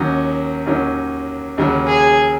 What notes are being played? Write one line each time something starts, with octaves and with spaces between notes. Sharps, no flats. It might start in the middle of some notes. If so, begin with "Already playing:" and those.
Already playing: D#2 D#3 F#3 C#4
D#2 D#3 F#3 C#4
D#2 C#3 F#3
G#4